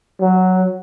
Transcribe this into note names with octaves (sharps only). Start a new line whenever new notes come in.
F#3